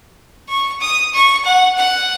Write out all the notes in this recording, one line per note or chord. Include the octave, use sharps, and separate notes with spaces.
C#6
D#6
C#6
F#5
F#5